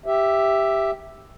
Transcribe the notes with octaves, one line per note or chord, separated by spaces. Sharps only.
G4 E5